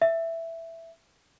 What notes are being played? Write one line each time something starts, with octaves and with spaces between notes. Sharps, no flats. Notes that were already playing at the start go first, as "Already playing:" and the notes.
E5